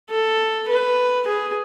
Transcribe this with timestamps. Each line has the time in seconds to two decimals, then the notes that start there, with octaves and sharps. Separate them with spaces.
0.10 A4
0.68 B4
1.27 G#4